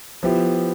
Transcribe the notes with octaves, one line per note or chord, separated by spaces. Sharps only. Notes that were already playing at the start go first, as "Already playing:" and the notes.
F3 B3 E4 G4